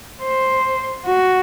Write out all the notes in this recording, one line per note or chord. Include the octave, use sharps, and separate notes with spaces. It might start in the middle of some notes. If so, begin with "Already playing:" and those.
C5
F#4